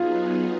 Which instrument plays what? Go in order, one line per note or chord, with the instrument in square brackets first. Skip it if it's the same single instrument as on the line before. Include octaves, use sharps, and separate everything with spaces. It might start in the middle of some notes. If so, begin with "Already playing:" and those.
Already playing: [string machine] F#3 B3 D#4 G#4 [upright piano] F4